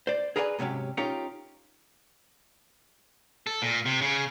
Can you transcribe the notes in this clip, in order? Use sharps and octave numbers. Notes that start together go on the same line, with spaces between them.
C5 D5
G#4 A#4 B4 D5 G5 G#5
G#2 C3 F#3 C#4 G4
C#4 D#4 F4 G4 A#4 C#5
A4
A#2
C3
C#3